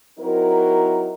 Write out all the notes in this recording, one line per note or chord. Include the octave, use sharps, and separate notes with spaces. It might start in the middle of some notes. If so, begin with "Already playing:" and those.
F#3 C4 D#4 E4 A#4